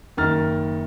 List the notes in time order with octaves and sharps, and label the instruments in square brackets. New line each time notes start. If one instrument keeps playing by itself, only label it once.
[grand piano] F#1 D#3 A#5 F6 A6